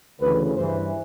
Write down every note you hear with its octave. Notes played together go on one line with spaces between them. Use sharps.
D2 C#3 E3 B4
G2 E3 C5